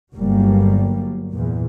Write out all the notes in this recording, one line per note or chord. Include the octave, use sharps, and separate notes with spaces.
G1 F#3 G3 A#3
E2 A#2